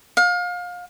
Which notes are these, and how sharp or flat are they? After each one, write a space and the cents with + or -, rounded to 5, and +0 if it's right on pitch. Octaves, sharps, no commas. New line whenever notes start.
F5 +30